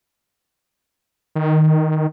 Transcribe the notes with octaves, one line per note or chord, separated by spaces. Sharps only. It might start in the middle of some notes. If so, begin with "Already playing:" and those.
D#3